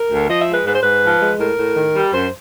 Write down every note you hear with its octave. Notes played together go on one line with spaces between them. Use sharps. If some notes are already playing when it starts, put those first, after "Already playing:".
Already playing: A#4
D2
F3 D#5
E5
G#3
B4
G#2 B4
C5
G#2 B4
F3
G#3
A2 A#4
A2
D#3
G3
F#2 C5